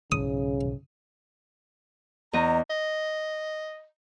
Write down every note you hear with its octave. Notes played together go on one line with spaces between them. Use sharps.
B1 G#2 C#3 E3 D#6
E2 D#5 A#5
D#5